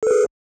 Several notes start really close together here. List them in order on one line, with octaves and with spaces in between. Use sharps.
A4 B4 G#4